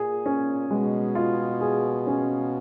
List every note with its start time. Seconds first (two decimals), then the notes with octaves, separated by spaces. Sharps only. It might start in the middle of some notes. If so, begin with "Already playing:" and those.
Already playing: A#2 G#4
0.26 C#4
0.70 B2 G#3
1.15 F4
1.60 G#4
2.07 C#4